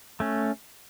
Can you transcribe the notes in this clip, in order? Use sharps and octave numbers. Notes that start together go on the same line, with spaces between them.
A3 C#4